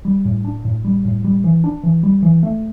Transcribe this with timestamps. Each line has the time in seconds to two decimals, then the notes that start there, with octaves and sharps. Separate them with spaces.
0.05 G3
0.25 A2
0.45 D4
0.65 A2
0.85 G3
1.05 A2
1.24 G3
1.44 E3
1.64 D4
1.83 E3
2.03 G3
2.22 E3
2.43 A3